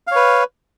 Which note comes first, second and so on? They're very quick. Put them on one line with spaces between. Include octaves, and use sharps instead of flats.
F5 C#5 B4